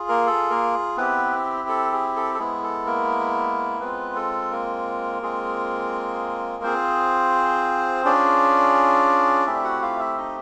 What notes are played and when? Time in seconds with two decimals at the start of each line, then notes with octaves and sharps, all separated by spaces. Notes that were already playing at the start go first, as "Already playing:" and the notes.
Already playing: F4 G#4
0.09 A#3 A#4
0.27 A4
0.50 A#3 A#4
0.97 B3 C4 E4 G4 B4
1.68 A4
1.92 G#4
2.16 A4
2.35 A4
2.39 G#3 B3 E4 G#4
2.63 A4
2.86 A#3 A#4
3.80 G#3 B3 C4 F4 B4
4.15 A4
4.51 A#3 A#4
5.22 G#3 C4 F4 G#4
6.63 C4 F4 G#4 C5
8.05 C#4 D4 F4 G#4 D5
9.46 A3 C4 E4 G4 E5
9.64 F#4 F#5
9.82 F4 F5
9.99 E4 E5
10.18 D#4 D#5